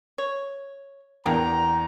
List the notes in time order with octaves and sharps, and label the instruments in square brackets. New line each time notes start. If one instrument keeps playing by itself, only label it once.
[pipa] C#5
[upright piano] E2 [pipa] A#3 D4 G4 [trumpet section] G5 A#5